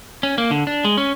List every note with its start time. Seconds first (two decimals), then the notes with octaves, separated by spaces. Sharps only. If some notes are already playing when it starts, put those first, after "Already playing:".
0.23 C#4
0.38 A#3
0.51 D3
0.67 D4
0.85 G#3
0.97 C#4